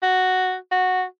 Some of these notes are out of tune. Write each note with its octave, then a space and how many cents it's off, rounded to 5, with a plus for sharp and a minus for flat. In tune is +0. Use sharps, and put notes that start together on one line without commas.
F#4 +0
F#4 -5